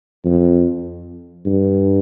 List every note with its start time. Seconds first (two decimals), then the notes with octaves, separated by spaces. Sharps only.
0.25 F2
1.46 G2